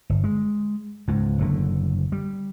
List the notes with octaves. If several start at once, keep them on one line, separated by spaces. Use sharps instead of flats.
G1
G#3
C#2 G#2
F#1 A2 D3
G3